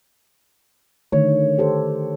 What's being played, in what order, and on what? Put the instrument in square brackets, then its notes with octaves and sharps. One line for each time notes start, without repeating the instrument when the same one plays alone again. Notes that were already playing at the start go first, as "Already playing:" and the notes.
[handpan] D3 D#3 A3 [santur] C#5
[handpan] G4 A4 C5